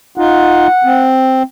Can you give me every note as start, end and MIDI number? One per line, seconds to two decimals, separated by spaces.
0.18 0.67 63
0.18 0.67 65
0.18 1.14 78
0.84 1.43 60